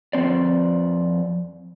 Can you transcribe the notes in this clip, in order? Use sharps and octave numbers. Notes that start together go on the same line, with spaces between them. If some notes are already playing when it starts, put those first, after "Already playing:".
F2 F3 C4 D5